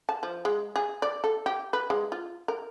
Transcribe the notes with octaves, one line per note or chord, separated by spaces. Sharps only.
A5
F3
G#3
G#4
D5
A4
G4
B4
G#3
F4
A#4